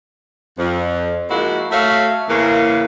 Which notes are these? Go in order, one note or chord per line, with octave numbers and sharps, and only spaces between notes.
F2
F3 G#3 A#3 E4 F#4
A3 F#4 C#5 E5 F5
E2 C#3 E3 A#3